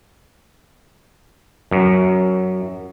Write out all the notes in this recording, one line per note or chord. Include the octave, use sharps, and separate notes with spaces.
F#2